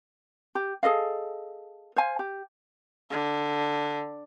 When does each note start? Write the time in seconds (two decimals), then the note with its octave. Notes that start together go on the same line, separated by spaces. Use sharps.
0.55 G4
0.83 G#4 A4 D#5 F5
1.96 C5 F5 G#5
2.19 G4
3.11 D3